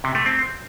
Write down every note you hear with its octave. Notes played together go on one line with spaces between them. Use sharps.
C3
A3
C4